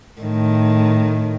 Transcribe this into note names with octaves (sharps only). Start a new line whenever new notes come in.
A2 D#3